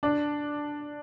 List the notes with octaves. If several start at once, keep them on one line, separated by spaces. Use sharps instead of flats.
D4